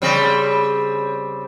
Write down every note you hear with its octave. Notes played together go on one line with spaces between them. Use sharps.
C#3 G3 C4